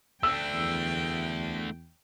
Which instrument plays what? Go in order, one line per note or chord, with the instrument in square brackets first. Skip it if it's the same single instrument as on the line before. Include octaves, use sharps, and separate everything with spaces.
[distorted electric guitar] A3 D4 [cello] G5 [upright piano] E6
[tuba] E2